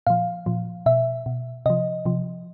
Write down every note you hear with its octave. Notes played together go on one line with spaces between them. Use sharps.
A#2 F3 F5
A#2 F3
B2 E5
B2
C3 F3 D#5
C3 F3